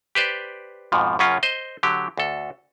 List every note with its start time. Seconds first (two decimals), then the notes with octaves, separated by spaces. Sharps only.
0.15 G4 B4 C5 D5
0.92 F2 G#2 B2 F3
1.19 F#2 C#3 C#4 F4
1.43 C5 D#5
1.83 D3 F#3 G4
2.18 D2 A4